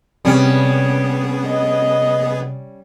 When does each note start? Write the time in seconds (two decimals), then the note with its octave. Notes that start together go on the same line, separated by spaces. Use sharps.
0.25 C3 G3 B3 C#4 G#4
1.45 D#5